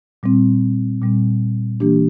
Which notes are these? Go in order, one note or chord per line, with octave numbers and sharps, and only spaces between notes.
A#2 G3 C4
A#2 G3 C4
E3 A#3 D4 G4